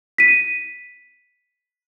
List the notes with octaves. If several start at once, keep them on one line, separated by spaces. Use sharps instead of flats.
B6 D#7